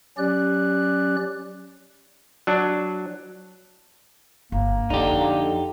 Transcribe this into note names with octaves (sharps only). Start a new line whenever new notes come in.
F#3 C#4 G4 D5 F#6
F#3 D4
G1 A#3
F2 D3 D#4 G4